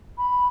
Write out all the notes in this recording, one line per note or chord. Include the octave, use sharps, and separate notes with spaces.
B5